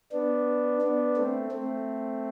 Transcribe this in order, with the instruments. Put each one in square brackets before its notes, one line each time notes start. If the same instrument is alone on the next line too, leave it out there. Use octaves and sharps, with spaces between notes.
[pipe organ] B3 D4
B3 D4
A3 C4
A3 C4